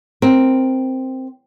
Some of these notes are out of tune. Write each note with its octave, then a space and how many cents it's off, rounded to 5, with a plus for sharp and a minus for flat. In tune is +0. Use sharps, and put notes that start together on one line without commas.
C4 +0 A#4 +0